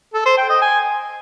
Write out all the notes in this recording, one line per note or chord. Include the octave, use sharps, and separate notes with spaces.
A4
C5
G5
D#5
G#5